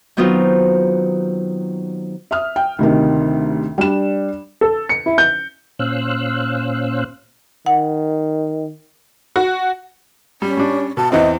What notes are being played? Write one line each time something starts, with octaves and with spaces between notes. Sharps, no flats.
D#3 F#3 B3 C4 D#4 F4
E5 D#6 F6
G5
D2 C3 D#3
G3 D4 E7
A4
C#7
E4
G6
A#2 C#4 C5 F5 E6 F#6
D#3 F#5
F#4
G3 C#4
G3 D4
B2 A5
E2 E3 C4 D#5